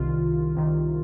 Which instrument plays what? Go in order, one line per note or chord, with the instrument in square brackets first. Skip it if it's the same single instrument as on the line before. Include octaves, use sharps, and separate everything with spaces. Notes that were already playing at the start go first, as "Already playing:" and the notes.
Already playing: [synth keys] C2 C3 D#3 F4
C2 C3 D#3